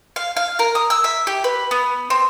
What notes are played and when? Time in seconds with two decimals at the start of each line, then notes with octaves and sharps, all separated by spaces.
0.16 F5
0.37 F5
0.59 A#4
0.75 D#6
0.90 E6
1.04 E5
1.27 G4
1.44 B4
1.71 B3
2.10 C4